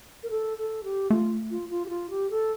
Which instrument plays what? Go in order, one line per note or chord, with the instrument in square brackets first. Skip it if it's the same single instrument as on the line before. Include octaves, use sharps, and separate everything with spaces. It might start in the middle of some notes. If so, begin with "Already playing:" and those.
[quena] A#4
A4
A4
G4
[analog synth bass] A3 [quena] F4
[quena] F4
F4
G4
F4
G4
A4